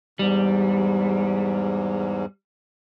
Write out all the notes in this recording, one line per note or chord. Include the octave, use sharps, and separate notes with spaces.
E2 G#2 G3